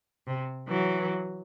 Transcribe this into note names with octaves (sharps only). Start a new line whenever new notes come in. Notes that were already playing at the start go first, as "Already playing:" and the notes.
C3
E3 F#3